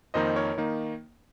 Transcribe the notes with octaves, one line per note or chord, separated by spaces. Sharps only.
F2 D#3 A#3 D#4 C5 D#5
A#4 C#5
D#3 A#3 D#4